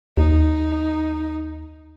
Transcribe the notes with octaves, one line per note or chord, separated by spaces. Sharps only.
D#2 D#4